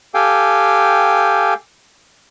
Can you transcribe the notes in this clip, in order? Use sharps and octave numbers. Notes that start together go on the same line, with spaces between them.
G4 A4 F5 G5 G#5